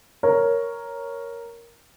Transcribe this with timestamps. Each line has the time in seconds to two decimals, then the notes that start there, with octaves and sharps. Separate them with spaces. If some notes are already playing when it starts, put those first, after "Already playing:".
0.23 A#4 C#5